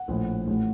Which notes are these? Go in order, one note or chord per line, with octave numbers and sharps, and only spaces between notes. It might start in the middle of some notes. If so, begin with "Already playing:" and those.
Already playing: F#5
A#1 A2
A1 A2